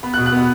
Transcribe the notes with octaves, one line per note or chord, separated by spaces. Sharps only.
B3 B5
F#6
B2
F#6
B3 B5